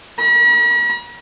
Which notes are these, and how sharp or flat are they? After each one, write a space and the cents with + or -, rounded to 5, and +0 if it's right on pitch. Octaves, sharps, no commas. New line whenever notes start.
B5 -45